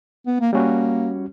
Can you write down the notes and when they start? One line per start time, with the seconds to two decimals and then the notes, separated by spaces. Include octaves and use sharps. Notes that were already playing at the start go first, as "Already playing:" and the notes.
0.27 B3
0.41 A#3
0.53 G3 A#3 C#4 F#4